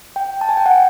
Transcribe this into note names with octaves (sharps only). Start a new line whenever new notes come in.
G5
A5
G#5
G5
F#5